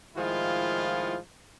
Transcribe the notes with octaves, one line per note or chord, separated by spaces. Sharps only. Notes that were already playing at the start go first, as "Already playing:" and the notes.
A2 D#3 F3 G#3 E4 F4